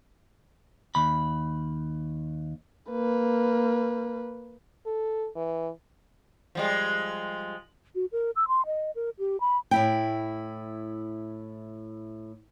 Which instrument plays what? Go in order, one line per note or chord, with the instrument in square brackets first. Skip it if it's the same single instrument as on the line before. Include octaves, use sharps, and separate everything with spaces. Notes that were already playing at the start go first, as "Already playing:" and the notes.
[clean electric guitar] D#2 B5
[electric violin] A#3 B4
[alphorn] A4
E3
[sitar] F3 G3 G#3
[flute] F#4
A#4
E6
C6
D#5
A#4
G4
B5
[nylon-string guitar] A2 E4 G5